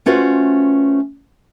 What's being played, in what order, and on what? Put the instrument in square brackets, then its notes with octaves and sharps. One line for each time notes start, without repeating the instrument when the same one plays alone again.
[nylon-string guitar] A3 C#4 F4 F#4 B4 C5